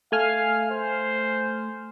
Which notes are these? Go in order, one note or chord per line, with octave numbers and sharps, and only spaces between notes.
A3 F5 G#5 F6
C5